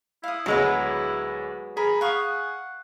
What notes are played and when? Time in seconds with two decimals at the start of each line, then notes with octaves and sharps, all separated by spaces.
0.24 E4 F5 D#6
0.46 D2 F#3 G#3 B3 G#4 C#5 B5
1.77 G#4 A#4 B5
2.01 F5 F#5 C#6 D#6